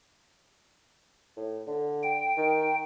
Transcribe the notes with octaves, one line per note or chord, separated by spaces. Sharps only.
A2
D3
G5
D#3